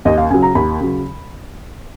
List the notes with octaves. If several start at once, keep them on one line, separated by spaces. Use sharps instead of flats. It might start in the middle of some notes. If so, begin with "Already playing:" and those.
D#2 D#5
F5
C#3 F#3 G#5
A#5
D#2 B5
C#3 F#3